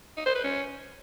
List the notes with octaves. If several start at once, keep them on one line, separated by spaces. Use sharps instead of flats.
D#4
C5
B4
C#4